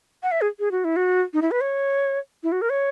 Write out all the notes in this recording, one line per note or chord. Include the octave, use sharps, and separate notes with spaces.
F#5
E5
G#4
G#4
F#4
E4
F#4
D#4
E4
B4
C#5
E4
F#4
A#4
C#5